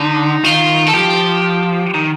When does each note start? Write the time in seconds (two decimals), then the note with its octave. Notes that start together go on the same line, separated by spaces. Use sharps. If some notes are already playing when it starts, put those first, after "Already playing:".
Already playing: D3 D#4
0.44 D#3 F4
0.87 A4
0.94 F3 G4
1.94 D#3